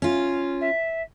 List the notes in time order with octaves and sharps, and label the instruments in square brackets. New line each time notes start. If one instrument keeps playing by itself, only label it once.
[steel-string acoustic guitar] C#4 F4
[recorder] E5